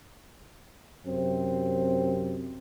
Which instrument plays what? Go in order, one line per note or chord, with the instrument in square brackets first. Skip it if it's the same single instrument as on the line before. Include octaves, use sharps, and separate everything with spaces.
[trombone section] F#2 C3 C4